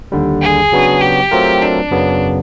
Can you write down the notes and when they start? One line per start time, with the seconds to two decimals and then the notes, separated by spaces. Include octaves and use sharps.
0.12 D#2 D3 G3
0.42 G#4
0.72 C#3 F#3 B3 D4 F#4
1.01 G4
1.31 F#3 A3 C4 F4 A#4
1.62 D4
1.91 F#2 C#3 F#3 B3